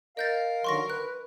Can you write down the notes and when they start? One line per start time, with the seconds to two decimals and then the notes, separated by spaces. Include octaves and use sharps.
0.17 A#4 D#5 F5 G6 A6
0.64 D3 D#3 F#3 C6 C#6 A#6
0.90 B4 F#6